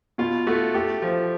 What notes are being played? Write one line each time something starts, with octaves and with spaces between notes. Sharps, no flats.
B2 F4
A3 F#4
A3 G4
F3